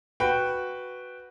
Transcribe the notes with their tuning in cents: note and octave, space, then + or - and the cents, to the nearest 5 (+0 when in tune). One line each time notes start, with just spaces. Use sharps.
F#4 +0 B4 +0 G5 +0